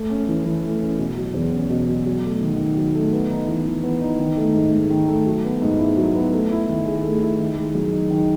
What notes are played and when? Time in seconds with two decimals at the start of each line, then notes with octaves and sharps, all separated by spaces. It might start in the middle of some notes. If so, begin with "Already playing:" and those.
Already playing: A3
0.10 C#4
0.28 E3
0.45 E3
0.63 A3
0.81 C#4
0.98 B2
1.17 F#3
1.34 E2
1.52 C#4
1.70 B2
1.88 F#3
2.06 F#3
2.24 A3
2.41 D#3
2.59 D#3
2.77 F#3
2.95 A3
3.12 B3
3.30 D#4
3.48 E3
3.66 E3
3.83 B3
4.01 D#4
4.19 D#3
4.37 A3
4.54 G#2
4.72 G#2
4.90 D#3
5.08 A3
5.26 F#3
5.44 B3
5.62 G#2
5.79 E4
5.97 F#3
6.15 B3
6.32 A3
6.51 E4
6.69 D#3
6.86 G#4
7.04 A3
7.22 E4
7.40 D#3
7.57 G#3
7.75 F#2
7.92 D#4
8.10 D#3